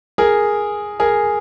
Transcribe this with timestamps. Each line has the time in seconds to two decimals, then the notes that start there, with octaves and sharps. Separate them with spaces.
0.18 G#4 A#4
1.00 G#4 A#4